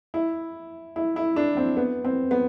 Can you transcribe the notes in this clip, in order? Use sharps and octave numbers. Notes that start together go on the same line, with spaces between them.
E4
E4
E4
D4
C4
B3
C4
B3